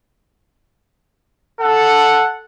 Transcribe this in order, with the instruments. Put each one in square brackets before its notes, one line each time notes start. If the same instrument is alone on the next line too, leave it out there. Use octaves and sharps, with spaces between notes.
[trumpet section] A4 F#5